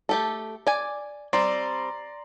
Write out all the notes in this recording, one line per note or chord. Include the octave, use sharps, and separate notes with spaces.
A3 G4 A4
D5 G#5
G3 C4 D5 A#5 C6